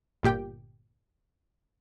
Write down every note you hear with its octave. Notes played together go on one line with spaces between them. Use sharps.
G1 A#2 G4 G5